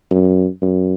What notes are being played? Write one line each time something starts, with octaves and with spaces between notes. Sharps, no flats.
F#2
F#2